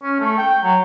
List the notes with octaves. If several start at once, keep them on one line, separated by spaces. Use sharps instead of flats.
C#4
A3
G5
F#3